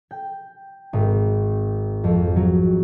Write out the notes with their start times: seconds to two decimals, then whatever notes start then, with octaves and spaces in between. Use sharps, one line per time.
0.11 G5
0.93 G#1
2.04 F2
2.36 F#3